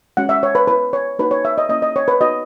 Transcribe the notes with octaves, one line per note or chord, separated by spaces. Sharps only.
G#3 C#4 F#4 F#5
E5
C#5
B4
B3 E4 B4
C#5
A#3 D#4 F#4 B4
C#5
E5
D#5
A#3 C#4 E4 D#5
D#5
C#5
B4
B3 D#4 F#4 D#5